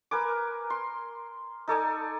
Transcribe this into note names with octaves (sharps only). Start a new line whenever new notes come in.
A#4 B4 G#5 D6
C6
D#4 A4 D5 G#5